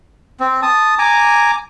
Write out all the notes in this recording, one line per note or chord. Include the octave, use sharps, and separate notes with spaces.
C4
A5 D#6
G#5 A#5 D6